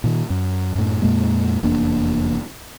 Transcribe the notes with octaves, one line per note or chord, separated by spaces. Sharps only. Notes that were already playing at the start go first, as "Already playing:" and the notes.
A#2 D#3
F#2
F#2 A2
F2 A#2 G#3 A#3
F1 E2 A#3 D4